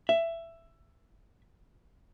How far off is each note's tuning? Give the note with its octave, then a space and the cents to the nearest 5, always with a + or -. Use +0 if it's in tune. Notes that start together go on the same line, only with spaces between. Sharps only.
E5 +15